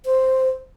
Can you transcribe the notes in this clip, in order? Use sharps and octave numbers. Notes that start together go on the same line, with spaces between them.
C5